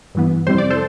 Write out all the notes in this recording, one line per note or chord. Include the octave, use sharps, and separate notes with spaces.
G2 E3 B3
F2 C3 G3 C4 E4 C5
D5
A4 C5